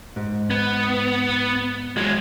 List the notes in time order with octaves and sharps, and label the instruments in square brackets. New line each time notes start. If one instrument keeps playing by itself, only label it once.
[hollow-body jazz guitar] G#2
[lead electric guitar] B3
F#3 G#3